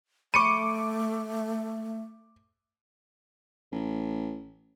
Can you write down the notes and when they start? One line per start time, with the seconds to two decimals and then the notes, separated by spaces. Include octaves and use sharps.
0.34 A3 B5 C#6 D6 C#7 D#7
3.72 A1